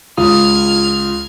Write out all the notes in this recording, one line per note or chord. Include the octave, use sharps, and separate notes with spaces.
C#2 F4 D#6 F6 G#6